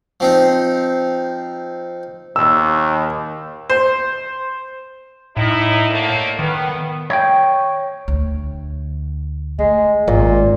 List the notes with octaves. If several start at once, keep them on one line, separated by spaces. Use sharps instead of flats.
F3 C4 D#4
D#2 E6
C5
A2 D#4 E4
D3 A3 A#3
D#3 B3
C#5 G5
D2
G#3 A3
G#1 A#2